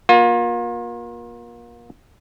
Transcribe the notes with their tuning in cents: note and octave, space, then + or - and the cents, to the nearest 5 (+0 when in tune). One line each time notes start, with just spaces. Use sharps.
A#3 +30 F4 +35